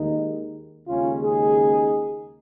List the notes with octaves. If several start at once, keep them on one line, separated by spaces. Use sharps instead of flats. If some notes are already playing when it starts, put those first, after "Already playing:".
Already playing: D#2 D#3 G#3 D#4
D#2 C#3 G#3 C#4 F4
D#4 G#4